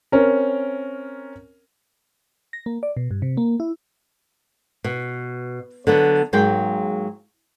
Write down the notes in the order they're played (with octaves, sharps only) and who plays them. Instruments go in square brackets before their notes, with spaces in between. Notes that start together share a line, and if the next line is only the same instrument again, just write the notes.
[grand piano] C4 C#4 A#4
[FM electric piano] A#6
A#3
D5
B2
G2
C3
A#3
E4
[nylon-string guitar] B2
D3 F#3 B3
G#2 F#3 G#3 A#3 G5